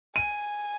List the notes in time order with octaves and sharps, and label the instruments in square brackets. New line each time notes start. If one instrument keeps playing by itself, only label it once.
[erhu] G#5 [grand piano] D#7